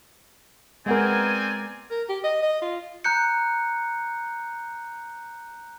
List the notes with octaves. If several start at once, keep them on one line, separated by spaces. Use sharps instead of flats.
G#3 B3 C4 A#4 D5 G#5
A#4
G4
D#5
D#5
F4
A#5 F#6 G6 C#7